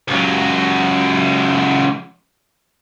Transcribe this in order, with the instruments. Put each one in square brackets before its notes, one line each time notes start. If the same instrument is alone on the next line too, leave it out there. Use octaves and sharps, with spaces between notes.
[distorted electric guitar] C#2 F#3